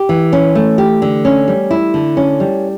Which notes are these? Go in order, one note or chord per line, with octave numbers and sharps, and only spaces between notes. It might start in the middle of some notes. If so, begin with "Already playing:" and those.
Already playing: G4
E3
C#4
A3
G4
D3
C#4
G3
E4
D3
C#4
G3